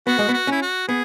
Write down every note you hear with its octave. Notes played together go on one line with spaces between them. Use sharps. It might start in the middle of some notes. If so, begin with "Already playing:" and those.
B3 F#4
G#3
B3
F#4
C#4 E4
F#4
B3 G#4